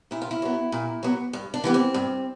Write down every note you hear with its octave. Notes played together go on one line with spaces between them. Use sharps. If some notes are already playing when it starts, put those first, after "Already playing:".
A#2 E4
F4
E4
F#3 B3
A#2
F#3 B3
G2
D4
E3 G3 B3
C4
G2